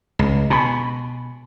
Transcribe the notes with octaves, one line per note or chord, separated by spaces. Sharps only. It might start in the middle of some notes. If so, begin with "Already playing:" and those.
C#2
B2 G#5 A5 B5